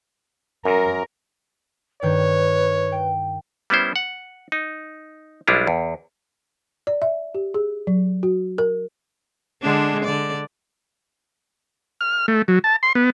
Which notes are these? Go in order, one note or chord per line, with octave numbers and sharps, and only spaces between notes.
F#2 A#4
G2 D#3 B4 C#5 G6
G5
G3 B3 C#4 E4 C5
F#5
D#4
B1 G3 G#3 D4 E4 F4
E2
D5
E5
G4
G#4
F#3
F#4
A#4
D3 G#3 D4
D3 D5
F6
A3
F#3
A5
C6
B3